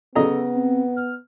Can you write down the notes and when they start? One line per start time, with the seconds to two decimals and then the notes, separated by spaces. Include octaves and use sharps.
0.16 C#3 B3 A4 D#5 A#5
0.55 C4
0.96 F6